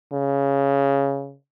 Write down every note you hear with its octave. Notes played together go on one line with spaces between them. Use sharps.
C#3